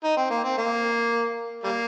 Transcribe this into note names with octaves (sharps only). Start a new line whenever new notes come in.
D#4
C4
A#3
C4
A#3
G3 A#3